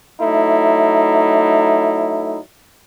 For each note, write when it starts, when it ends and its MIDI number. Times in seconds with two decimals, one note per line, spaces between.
0.21 2.38 54
0.21 2.38 57
0.21 2.38 63
0.21 2.38 64